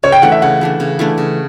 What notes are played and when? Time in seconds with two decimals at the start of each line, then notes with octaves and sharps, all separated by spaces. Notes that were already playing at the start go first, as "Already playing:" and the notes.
0.03 C#3 C#5
0.12 G5
0.22 E3 A3 D4 F#5
0.32 E5
0.42 C#3 F#5
0.61 E3 A3 D4
0.80 C#3
0.99 E3 A3 D4
1.18 C#3